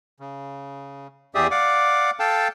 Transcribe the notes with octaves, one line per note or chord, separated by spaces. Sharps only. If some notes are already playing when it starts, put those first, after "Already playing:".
C#3
E2 G4 G#4 D5 E5 D#6
D5 F5 F#5 D6
A4 F5 G5 A5